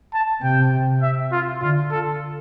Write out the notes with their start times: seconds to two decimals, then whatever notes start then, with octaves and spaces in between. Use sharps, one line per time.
0.13 A5
0.43 C3 G5
1.02 E5
1.32 F4
1.61 D3 F4
1.91 A4